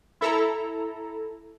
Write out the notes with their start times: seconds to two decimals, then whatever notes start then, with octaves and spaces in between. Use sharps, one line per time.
0.21 E4 A4 A#5